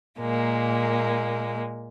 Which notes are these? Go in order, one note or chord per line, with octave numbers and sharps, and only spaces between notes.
A#2 G#3 A#3